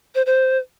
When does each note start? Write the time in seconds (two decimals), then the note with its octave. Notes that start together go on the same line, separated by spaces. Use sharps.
0.15 C5
0.26 C5